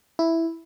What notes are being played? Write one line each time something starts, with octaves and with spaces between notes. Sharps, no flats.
E4